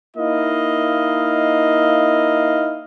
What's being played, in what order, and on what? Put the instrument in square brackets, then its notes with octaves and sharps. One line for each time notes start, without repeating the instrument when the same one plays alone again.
[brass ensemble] A#3 D#4 E4 D#5 F5